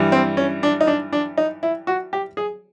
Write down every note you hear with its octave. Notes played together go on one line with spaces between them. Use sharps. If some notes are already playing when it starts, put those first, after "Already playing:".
Already playing: G2 E3 G3
C4
C#4
D4
D#4
D4
D4
D#4
E4
F#4
G4
G#4